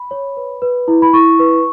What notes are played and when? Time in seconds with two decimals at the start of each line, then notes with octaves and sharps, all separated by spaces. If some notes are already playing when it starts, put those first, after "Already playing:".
Already playing: B5
0.11 C#5
0.37 B4
0.62 B4
0.88 E4
1.02 B5
1.13 E4 C#6
1.39 B4